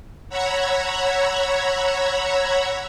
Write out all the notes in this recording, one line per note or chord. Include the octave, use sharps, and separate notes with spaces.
C#5 F#5 A#5 B5 E6 G#6